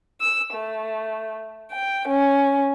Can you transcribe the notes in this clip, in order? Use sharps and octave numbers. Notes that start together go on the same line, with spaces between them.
E6
A3
G5
C#4